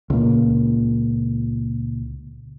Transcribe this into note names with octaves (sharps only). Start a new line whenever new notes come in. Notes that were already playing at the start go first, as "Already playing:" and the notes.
C#2 A#2